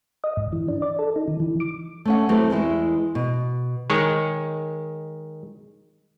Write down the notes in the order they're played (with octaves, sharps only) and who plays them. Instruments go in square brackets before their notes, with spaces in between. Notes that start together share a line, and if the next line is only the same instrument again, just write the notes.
[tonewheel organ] D#5
G#2
E3
D4
D5
A4
D#4
D#3
E3
D6
[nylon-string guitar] A3 C#4 F#5
E3 F#3 A3 C4 G4 B4
E2 E3 G#3 E4
B2
[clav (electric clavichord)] D#3 G#3 C#5